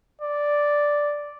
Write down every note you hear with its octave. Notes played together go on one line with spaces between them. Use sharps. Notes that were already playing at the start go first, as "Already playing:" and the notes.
D5